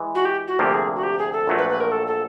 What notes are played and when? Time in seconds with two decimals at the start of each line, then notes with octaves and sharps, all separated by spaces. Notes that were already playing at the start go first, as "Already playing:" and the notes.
Already playing: E3 G#3
0.15 F#4
0.25 G4
0.48 F#4
0.59 D2 C3 F3 A#3 G4
0.74 G#4
0.95 F#4
1.03 G4
1.19 G#4
1.33 A4
1.47 A#1 A#2 F#3 A3
1.58 B4
1.69 B4
1.80 A#4
1.92 A4
2.07 A4